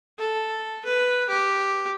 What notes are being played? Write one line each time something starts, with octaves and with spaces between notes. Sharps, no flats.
A4
B4
G4